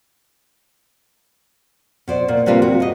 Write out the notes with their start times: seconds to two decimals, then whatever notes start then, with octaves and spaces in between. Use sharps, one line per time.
2.08 B2 C5 D5
2.28 A#2
2.46 C3 G3 A#3 D4 F4 B4
2.62 F#4
2.80 G#2 D#5